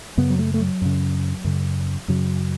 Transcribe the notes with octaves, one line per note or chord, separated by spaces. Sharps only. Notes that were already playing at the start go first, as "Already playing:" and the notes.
F#2 C#3 B3
F#3
A3
A3
F#3
F#2 C#3
F#2 C#3
F#2 C#3 F#3